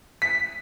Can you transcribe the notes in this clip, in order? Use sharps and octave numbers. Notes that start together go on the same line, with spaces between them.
B6